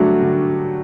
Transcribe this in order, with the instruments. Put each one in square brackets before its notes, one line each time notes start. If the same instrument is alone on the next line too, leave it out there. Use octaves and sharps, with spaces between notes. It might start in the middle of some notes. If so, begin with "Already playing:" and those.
Already playing: [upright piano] D3 A3 D4 F#4 [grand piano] F#3 G3
[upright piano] D3